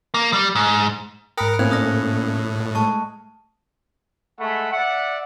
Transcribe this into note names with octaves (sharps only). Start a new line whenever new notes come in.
A#3
G3
G#2
G#2 A#4 G5 B5 D#6 F6 F#6 C#7
A2 A#3 C4 C#4 C5 F#6 G#6 F7
A4 D5 D#6 F6 A#6
G#3 A3 A5 C#6
G#3 A3 F#5 B5
D5 E5 F#5